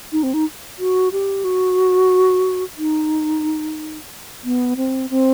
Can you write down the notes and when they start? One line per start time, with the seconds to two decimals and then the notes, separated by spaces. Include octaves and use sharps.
0.12 D#4
0.23 C4
0.34 D#4
0.79 F#4
1.12 G4
1.44 F#4
2.78 D#4
4.44 B3
4.77 C4
5.10 C4